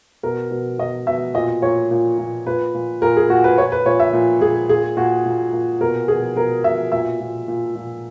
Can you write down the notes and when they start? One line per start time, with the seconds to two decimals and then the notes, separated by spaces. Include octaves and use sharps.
0.23 B2 A#4
0.51 B2
0.79 B2 D#5
1.07 B2 E5
1.34 A#2 D#5
1.62 A#2 C#5
1.91 A#2
2.18 A#2
2.46 A#2 B4
2.75 A#2
3.02 A#2 A#4
3.17 G#4
3.29 A#2 F#4
3.44 B4
3.58 A#2 C#5
3.72 B4
3.86 A#2 C#5
4.00 E5
4.13 A#2
4.41 A#2 G#4
4.69 A#2 G#4
4.97 A#2 F#4
5.26 A#2
5.53 A#2
5.81 B2 A#4
6.08 B2 G#4
6.36 B2 A#4
6.64 B2 E5
6.92 A#2 E5
7.20 A#2
7.48 A#2
7.76 A#2